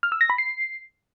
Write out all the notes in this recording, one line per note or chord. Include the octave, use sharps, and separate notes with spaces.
F6
E6
A#6
B5
C7